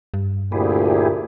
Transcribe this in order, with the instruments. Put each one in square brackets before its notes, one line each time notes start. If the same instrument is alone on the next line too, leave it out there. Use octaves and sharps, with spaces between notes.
[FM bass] G2
[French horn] D2 [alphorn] A#2 [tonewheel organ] E4 G4 G#4